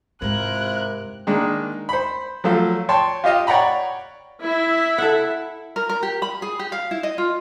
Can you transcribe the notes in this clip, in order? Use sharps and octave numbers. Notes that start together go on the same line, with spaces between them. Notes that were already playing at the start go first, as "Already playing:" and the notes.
G#2 C3 E4 F4 A#4 F#6
D#3 G#3 A#3 D4
C5 B5
F3 F#3 A3 F4
C#5 G5 A5 C6
F4 G4 D#5 F5
C#5 D5 F#5 G5 A#5 B5
E4 E5
A4 F#5
A#4
A#4
G4
B5
G#4
G4
F5
E4
D#5
F4